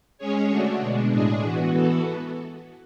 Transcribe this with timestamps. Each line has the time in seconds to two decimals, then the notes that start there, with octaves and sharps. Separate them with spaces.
0.18 G#3 C#4 G#4 C#5
0.48 D3 A3 D4 F#4
0.80 B2 G#3 D4
1.10 A2 G#3 D4 G#4
1.41 E3 B3 F#4
1.72 E3 B3 F#4 A4